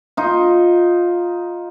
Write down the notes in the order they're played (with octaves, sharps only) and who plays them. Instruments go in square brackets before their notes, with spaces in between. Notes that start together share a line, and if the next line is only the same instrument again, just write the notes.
[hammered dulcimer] D#4 F4